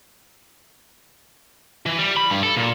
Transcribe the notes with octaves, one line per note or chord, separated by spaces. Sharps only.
E3
G3
B5
G2
A4
A#2